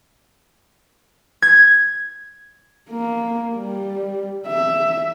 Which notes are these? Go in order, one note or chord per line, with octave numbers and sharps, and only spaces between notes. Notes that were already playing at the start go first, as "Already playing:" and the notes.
G#6
A#3
G3
E5